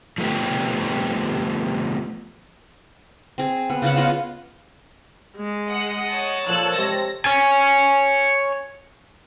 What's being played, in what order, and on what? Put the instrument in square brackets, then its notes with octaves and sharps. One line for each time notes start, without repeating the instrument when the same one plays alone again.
[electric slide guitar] F3 A3 B3 G4
[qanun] C4 G#4
B3
C#3 F4 F#5
B3 F4 D#5
[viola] G#3
[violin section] D#5 F#5
[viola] C#5 A5
[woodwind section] A#2 F3 [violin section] A4 E6 F#6
[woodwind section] C3 G#3 [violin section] A#6
[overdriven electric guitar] C#5 G#5